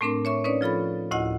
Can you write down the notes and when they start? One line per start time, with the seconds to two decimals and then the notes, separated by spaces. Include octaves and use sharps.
0.01 A2 A3 C4 D4 A#4 C6
0.25 C#5 E5 C#6
0.44 C#4 D#4 B4 C#5 D5
0.61 F3 F4 A4 B5 A6
1.11 D2 A2 E4 F#4 D#5 F#5